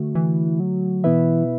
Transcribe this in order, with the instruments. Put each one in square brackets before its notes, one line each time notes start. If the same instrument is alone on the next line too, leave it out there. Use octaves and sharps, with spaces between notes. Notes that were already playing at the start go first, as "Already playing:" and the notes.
Already playing: [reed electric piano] D3 A3 F#4
[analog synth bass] E3
F#3
[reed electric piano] B2 B3 E4 B4 E5 [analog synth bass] E3